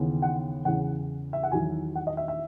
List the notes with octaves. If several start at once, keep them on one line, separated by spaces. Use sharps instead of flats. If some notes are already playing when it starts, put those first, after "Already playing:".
Already playing: D#2 C#3 E3 B3
F#5
E2 C#3 E3 F#5
E5
F#5
E2 D#3 F#3 G#5
F#5
D#5
E5
E5